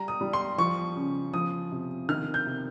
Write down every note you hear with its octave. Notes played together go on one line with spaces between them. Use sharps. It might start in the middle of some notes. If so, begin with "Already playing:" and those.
Already playing: G3 A#5
D#6
G3
C6
F3 C#6
C#3
F3 D#6
C3
D#3 F6
G6
C3